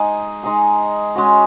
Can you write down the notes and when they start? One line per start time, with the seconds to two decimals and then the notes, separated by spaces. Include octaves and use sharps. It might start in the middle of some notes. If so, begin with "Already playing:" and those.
Already playing: G#3 D#4 G#4
0.43 G#3 D#4 G#4
1.15 G#3 C#4 F#4